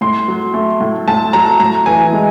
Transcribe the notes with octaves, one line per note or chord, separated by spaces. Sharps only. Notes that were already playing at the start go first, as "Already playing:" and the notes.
A2 C6
F#3
A3
A2
A2 A5
F#3 A#5
A2 A#5
E3 G#5
G#3